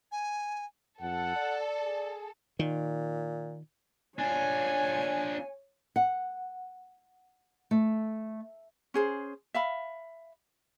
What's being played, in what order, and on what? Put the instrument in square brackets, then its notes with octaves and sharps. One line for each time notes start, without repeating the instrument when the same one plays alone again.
[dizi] G#5
[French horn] F2 [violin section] A4 [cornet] F#5
[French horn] D5
[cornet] G#4
[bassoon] A#2 [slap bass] D#3
[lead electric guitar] D4 F4 [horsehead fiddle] C#5 [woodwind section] G#5
[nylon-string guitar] F#5
A3
[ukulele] C#4 G#4 C5
E5 F5 B5